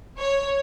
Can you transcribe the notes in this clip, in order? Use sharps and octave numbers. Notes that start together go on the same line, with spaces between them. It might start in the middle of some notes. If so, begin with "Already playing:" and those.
C#5